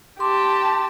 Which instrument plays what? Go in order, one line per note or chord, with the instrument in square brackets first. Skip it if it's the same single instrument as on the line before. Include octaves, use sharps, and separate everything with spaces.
[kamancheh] G4 A5 [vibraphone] C6 D6